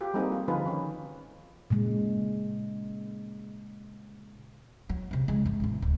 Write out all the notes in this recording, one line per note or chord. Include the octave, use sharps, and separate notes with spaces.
F4 G4 G#4
G3 A#3 C4 D#4 G#4 A4
F4
D3 F3 D#4 F4 G#4 B4
D#3 C#4
A#2 C#3 G#3
F#3
E2 C3
C#3 G#3
G#1 E2
A1 E2
D1